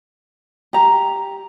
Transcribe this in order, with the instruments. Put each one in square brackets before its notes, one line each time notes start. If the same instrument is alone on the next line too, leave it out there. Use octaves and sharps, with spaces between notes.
[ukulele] G4 A#5